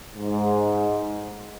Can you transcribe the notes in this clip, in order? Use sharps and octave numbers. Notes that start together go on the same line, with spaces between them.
G#2